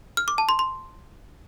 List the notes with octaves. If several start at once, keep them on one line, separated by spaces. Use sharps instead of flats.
F6
D6
A5
C6
C6